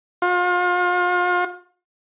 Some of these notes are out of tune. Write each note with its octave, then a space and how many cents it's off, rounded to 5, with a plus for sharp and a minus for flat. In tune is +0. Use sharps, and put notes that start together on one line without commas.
F4 +40